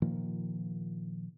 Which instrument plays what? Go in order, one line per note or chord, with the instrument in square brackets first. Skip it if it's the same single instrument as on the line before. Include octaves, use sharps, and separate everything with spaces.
[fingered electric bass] A#2 D#3 F3 A#3